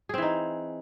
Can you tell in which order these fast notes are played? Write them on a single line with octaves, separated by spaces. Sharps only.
G#4 C4 E3 D#4